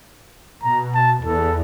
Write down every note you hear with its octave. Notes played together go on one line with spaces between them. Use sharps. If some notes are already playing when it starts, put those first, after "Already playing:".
B2 A#5
A5
E2 A4